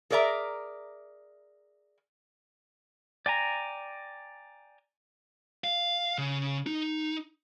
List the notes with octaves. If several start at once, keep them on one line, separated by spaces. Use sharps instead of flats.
G#4 A#4 D5 E5 A#5
D5 G5 G#5 A#5
F5
C#3
D#4